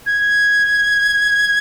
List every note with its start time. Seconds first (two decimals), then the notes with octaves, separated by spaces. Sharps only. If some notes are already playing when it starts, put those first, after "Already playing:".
0.06 G#6